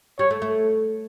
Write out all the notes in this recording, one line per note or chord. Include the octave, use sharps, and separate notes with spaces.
G3 C#5
A3
A3